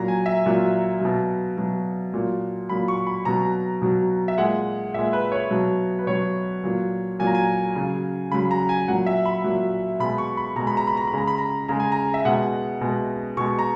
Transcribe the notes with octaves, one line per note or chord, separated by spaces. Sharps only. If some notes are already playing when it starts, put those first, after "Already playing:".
Already playing: A#2 F#3 A#5
G#5
E5
A#2 F#3
B2 F#3
B2 F#3
A#2 F#3
A#2 F#3 B5
C#6
B5
B2 F#3 A#5
B2 F#3
E5
A#2 G#3 F#5
A#2 G#3 E5
B4
C#5
B2 F#3
B4
B2 F#3 C#5
A#2 F#3
A#2 F#3 G#5
A#5
G#5
C#3 F#3
C#3 F#3 B5
A#5
G#5
A#2 F#3 F#5
E5
B5
A#2 F#3
B2 G#3 B5
C#6
B5
B2 G#3 A#5
B5
A#5
B5
A#5
B5
C#3 G#3 A#5
B5
A#5
C#3 G#3 A#5
G#5
A#5
E5
B2 G#3 F#5
B2 G#3
B2 G#3 C#6
A#5